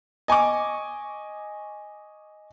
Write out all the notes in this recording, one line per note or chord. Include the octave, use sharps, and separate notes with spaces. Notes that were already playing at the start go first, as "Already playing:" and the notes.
D#5 G#5 C#6 D6